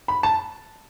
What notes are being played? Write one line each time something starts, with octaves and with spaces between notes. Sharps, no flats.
B5
A5